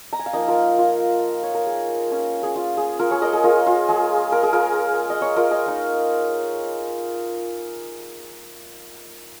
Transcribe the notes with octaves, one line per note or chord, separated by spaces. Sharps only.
A#5
G#5
F5
F3 A#3 D#4 A#4 D#5
F4 A#4
F4
C#5
A#4
G#4
A#3 C#4 F4
G#4
F4
G#4
F4 A#4
G#4 C#5
A#4 D#5
G#4
F4 A#4
F4
G#3 F4 G#4
A#4
G#4
F4 A#4
D#5
G#4 C#5
F4 A#4
D#5 G#5
A#3 D#4